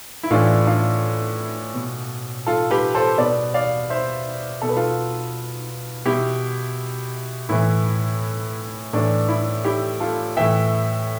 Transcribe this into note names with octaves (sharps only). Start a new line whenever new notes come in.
E4
A2 E3 D4 F4
D4 F4
B2
F4 A4
G4 B4
A4 C5
B2 B4 D5
D5 F5
C5 E5
B2 A4
B4
F4 A4
B2 E4 G4
A2 E3 E4
A2 E3 D4
E4
E4 G4
F4 A4
A2 E3 E5 G5